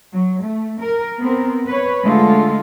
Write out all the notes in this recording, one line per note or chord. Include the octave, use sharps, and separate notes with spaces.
F#3
A3
A#4
B3 C4 A#4
B4 C#5
D3 G#3 A3 F4 A4